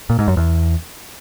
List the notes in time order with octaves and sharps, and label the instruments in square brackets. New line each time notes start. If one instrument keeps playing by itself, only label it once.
[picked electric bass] A#2
G#2
F#2
E2